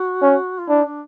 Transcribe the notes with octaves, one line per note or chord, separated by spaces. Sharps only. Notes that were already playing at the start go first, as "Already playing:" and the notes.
Already playing: F#4
C#4
F4
D4 E4
D4